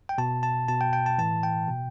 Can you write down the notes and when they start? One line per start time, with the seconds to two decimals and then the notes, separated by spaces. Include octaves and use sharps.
0.09 G5
0.18 B2 A5
0.43 A5
0.68 B2 A5
0.81 G5
0.93 G5
1.06 A5
1.18 A2 E3 A5
1.43 G5
1.68 B2